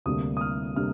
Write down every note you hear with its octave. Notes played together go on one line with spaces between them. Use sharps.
D2 C3 G3 A#3 D4 D#6
D#6
F6
C3 G3 A#3 D4 F6